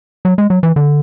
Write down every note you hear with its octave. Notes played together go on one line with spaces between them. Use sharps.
F#3
G#3
F#3
E3
D3